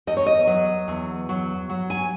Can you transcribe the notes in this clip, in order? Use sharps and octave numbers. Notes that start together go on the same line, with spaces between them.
E2 D#5
C#5
D#5
F#3
E2
F#3
F#3
G#5